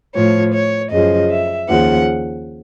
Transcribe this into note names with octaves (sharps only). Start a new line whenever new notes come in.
A2 F3 C#5
C#5
F#2 C#3 F3 D#5
E5
D#2 C#3 F3 F#5